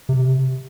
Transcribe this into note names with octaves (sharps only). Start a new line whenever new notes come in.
C3